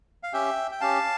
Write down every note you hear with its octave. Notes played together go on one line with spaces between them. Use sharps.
F5
C#4 G4 E5 G5
G5
C#4 G4 F5 A5